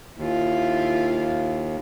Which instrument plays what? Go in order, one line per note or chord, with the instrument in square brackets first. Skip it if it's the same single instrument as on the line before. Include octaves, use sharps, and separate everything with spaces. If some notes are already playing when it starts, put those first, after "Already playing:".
[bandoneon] D#2 [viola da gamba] E4 F4